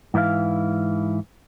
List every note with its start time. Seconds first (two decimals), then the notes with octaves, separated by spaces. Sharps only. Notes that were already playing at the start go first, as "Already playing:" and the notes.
0.14 G#2 E3 E4 A#4 F5